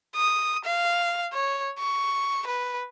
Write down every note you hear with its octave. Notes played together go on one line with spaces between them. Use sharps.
D#6
F5
C#5
C#6
B4